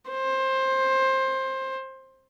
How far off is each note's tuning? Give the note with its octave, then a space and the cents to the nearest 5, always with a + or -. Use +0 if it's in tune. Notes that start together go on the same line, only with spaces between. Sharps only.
C5 +20